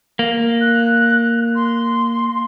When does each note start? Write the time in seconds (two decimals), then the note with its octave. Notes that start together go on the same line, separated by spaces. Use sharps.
0.19 A#3
0.61 F#6
1.55 C6